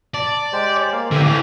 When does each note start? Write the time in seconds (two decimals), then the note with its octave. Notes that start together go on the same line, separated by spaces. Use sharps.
0.14 D5 A5
0.53 G#3 G4 C5
0.92 A#3 F5
1.11 A2 D3 E3 C4 G4 E6
1.26 E3 G4 F5